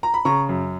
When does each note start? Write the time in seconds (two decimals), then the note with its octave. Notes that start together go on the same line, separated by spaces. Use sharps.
0.03 A#5
0.14 B5
0.25 C#3 A#5 C#6
0.49 F#2